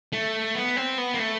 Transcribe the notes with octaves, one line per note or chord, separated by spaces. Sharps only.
A3
B3
C4
B3
A#3
A3